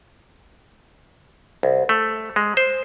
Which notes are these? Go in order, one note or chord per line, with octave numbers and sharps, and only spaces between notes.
C2
A3
G#3
C5